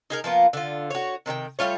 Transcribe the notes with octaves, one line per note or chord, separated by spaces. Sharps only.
D#4 G#4 A#4
F3 A#3 B3 F4
D3 F4
F#4 C#5
C3 D#3 E4 G5
G3 A3 F4 C#5